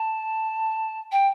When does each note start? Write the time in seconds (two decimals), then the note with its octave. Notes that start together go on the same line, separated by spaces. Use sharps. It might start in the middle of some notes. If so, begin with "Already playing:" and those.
Already playing: A5
1.11 G5